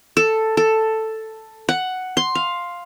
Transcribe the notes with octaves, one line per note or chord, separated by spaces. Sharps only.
A4
A4
F#5
C6
F5